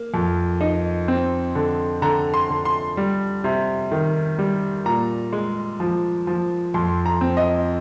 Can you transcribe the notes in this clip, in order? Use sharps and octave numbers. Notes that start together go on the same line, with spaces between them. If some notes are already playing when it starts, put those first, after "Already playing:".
Already playing: A#3
F2
D#4
C4
D3
D3 A#5
C6
D3
C6
G3
C3
D#3
G3
A#2 A#5
G#3
F3
F3
F2 C6
A#5
C4
D#5